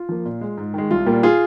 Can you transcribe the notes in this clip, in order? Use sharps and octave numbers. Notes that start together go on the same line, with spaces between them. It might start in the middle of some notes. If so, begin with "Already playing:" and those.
Already playing: F4
F3 A#3
A#2
G#3
G#2
D#3 G#3
C2 F4
A#2 G3 A#3
F4 G#4